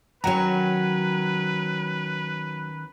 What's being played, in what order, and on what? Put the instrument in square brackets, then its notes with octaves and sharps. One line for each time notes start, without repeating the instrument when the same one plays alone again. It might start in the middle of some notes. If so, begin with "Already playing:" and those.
[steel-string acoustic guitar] D#3 C#4 [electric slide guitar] F#3 F#5 A#5 [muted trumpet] B4